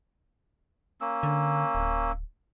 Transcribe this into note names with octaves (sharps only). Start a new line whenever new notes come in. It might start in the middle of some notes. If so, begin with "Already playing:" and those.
A#3 C#4 E6
D3
D1